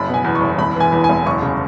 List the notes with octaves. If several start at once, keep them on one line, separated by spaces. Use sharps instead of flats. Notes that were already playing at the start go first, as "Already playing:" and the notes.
Already playing: F#1 B5
B2
G#5
E2
C#6
F#1
E1 B5
E3 G#5
E2
G#5
E1
F#1 C#6
C#3